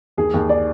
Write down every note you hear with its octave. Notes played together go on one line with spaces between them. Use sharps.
D#2 G#4
D#2
D5